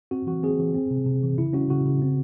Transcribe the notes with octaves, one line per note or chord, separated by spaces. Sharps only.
C4 F#4
E3 F#4
C4 G#4
E3
C4
C3
C3
E3
C#3 E4
C#4 F#4
C#3 F#4
C#3
C4